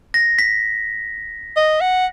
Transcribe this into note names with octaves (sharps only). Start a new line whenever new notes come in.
A#6
B6
D#5
F#5